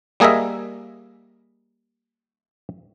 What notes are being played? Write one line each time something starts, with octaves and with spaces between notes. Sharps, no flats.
G3 A#3 G#4 A#4 D#5 E5